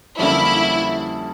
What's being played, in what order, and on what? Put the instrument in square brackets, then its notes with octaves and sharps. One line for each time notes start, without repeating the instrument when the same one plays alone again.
[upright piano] F2 D3 G3 A#3 C#4 [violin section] E4